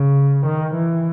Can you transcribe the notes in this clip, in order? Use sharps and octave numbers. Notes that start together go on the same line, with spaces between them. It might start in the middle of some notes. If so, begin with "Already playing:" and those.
Already playing: C#3
D#3
E3